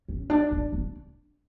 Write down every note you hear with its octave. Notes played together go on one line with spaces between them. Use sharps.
C#4
D4
D4
D4